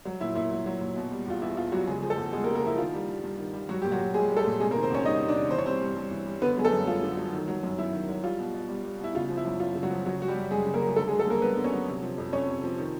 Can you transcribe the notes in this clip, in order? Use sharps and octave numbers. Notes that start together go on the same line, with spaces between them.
F#3
A#2 E4
A#2 E4
F#3
F#3
A#2
B2
G3
E2 F4
E2 E4
B2 F4
F#3 G3 F#4
C#3 G#3 G#4
F3 G#4
A3 A4
E2
E2 G#3 G#4
A#3 A#4
C#3
A#3 A#4
F3 E4
D#3 F4
G3
G2
G2
D#3
G3
F#3 G3 F#4
A#2 G4
F#3 F#4
A#2
G3 G#3 G#4
G3
A3 A4
A#2
C3 G#3 G#4
A#3 A#4
D#3
C4 C5
E2 C#4 C#5
G3 D#4 D#5
C3
D4 D5
D#3
E3 C5
C#5
G3 C4 C5
G2
G2
E3
G3
D3 B3 B4
F#3 G#4
A3 A4
F#2
F#2 F4
D3
F#3
D#3
F#3
F#2
F#2 E4
D#3
F#3
G3 F4
B2
B2
G3
G3
B2 E4
C#3 F4
F3
E4
F#2
F#2 F4
C#3
F#3 F#4
F3
C#3 F#3 F#4
F#3 F#4
G3 G4
F#2
F#2 G#3 G#4
C#3
A#3 A#4
F#3
G#4
D3 A3 A4
G#3 G#4
F#3
A3 A4
G2 A#3 A#4
G2 B3 B4
D3
C#4 C#5
F#3
C3
F3
F2
F2 C#4 C#5
C3
F3
D#3